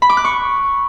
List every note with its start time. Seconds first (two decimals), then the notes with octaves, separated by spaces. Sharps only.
0.02 B5
0.10 D6
0.17 F#6
0.25 C#6